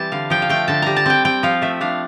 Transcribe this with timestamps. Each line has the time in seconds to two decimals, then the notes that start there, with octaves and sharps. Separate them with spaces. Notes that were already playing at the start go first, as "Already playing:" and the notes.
Already playing: E3 G3 C4 A5
0.12 D3 F5
0.30 F3 G5
0.42 F5
0.49 A3 G5
0.68 D3 A5
0.82 G3 A#5
0.96 A5
1.06 C4 G5
1.25 C4 G5
1.43 F3 F5
1.62 A3 E5
1.81 D4 F5